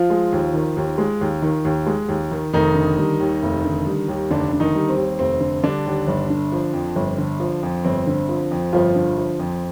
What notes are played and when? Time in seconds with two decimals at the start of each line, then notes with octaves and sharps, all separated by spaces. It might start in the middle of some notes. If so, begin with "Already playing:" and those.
Already playing: F3 F4
0.10 G#3
0.32 D#2
0.54 D#3
0.77 D#2
0.98 G#3
1.21 D#2
1.42 D#3
1.65 D#2
1.87 G#3
2.09 D#2
2.31 D#3
2.53 F1 D#3 D#4
2.75 D3
2.98 G3
3.20 D#2
3.43 F1
3.65 D3
3.87 G3
4.08 D#2
4.30 F1 D3 D4
4.53 D3
4.60 D#3 D#4
4.75 G3
4.89 C4
4.97 D#2
5.19 F1 C4
5.41 D3
5.63 D3 G3 D4
5.86 D#2
6.08 G1
6.30 D3
6.52 F3
6.73 F2
6.96 G1
7.18 D3
7.40 F3
7.63 F2
7.85 G1 C4
8.07 D3
8.29 F3
8.52 F2
8.73 G1 F3 F4
8.96 D3
9.18 F3
9.40 F2